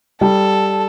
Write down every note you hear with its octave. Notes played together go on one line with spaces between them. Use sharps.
G3 A4